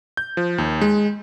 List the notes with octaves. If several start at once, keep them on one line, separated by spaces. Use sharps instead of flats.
G6
F3
D#2
G#3